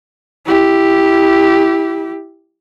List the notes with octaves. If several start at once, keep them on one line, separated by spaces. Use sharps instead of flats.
E4 G4